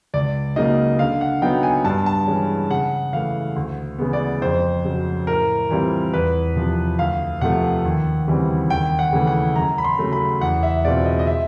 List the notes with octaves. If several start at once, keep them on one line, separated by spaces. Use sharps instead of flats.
C#2 D5
C#3 F#3 A#3 D#4 D#5
D3 F5
F#5
F#3 B3 D#4 G5
G#5
G2 A5
A5
E3 G#3 C#4
C#3 F#5
E3 A3 F5
D2
C#3 E3 G#3 B3
D5
F2 C5
C#3 F#3
A2 A#4
E3 G3 C4 F4
E2 B4
C3 F3
D2 F5
C3 F3 A3 F#5
D#2
C#3 E3 G3 C4
D#2 G5
F#5
C#3 E3 A3
F#5
F#2 A#5
B5
C6
C#3 F#3 A3
B5
E2 F#5
E5
B2 G#3 C4 F4 D5
D#5
D#5
E5